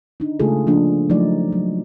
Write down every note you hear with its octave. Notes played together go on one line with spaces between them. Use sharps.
D4 D#4
C#3 G#3 A3 F4 G#4 A4
F3 A#3 D4
F3 F#3 A3 D#4 D5
F#3